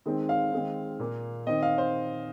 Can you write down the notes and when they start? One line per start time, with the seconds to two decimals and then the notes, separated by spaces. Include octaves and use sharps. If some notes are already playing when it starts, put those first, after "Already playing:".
0.06 D#3 G#3 C4
0.29 F5
0.52 D#3 G#3 C4
0.99 A#2 A#3
1.47 D#3 C4 D#5
1.62 F5
1.78 C5